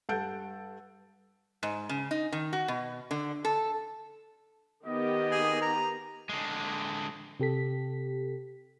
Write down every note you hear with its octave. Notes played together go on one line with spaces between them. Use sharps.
G2 A4 F#5 A5 G6 D7
G#2
C#3
D#4
D#3
F#4
B2
D3
A4
D#3 B3 G4 D#5
G#4
A#5
D3 G#3
C3 G4 A4 B6